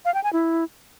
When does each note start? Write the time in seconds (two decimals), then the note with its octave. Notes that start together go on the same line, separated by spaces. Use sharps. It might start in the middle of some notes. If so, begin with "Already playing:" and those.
0.05 F5
0.14 G5
0.24 G#5
0.33 E4